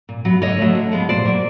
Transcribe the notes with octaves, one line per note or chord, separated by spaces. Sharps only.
A#2
F#3 B3
D3 C#5 D#5
F#3 A3
D3
F3 G#3 B3
A#2 C5 D5
F#3 A#3